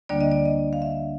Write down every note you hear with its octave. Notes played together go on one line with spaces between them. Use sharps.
D2 D3 G3 A#3 D4 D5
D#5
D5
D#5
F5
E5